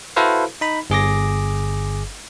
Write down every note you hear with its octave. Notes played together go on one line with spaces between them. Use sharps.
E4 F#4 A4 B4 C5 F5
D#4 B5
G1 G#4 D6 A#6